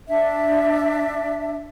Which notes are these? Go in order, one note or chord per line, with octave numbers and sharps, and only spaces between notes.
D4 E5